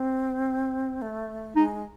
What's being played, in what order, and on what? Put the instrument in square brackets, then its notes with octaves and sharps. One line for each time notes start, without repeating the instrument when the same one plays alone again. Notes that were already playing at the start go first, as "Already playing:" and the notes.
Already playing: [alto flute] C4
A3
[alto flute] G#3 [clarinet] D#4